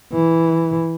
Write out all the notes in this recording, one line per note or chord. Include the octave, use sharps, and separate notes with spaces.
E3